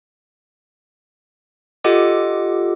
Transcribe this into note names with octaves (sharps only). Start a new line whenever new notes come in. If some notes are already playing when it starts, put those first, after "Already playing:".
F4 G4 A4 D#5 F#5 D6